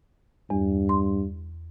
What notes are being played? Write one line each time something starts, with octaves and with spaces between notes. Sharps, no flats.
E2 G2
C6